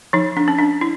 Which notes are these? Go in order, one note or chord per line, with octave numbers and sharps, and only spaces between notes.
F3 D#4
D4
C#4
D4
E4